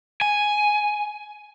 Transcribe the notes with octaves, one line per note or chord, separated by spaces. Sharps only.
G#5